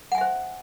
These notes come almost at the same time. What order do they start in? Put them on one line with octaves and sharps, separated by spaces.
F#5 G#5 E5 C5